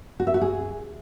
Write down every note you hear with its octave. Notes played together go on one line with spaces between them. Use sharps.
F#4
E5
F#4
G#4